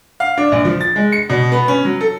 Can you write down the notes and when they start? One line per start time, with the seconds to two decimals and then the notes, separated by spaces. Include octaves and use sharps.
0.20 F5
0.38 D4
0.52 A#1
0.65 F3
0.81 A6
0.96 G#3
1.12 C#7
1.29 B2
1.52 B3
1.68 C#4
1.85 F#3
2.01 A4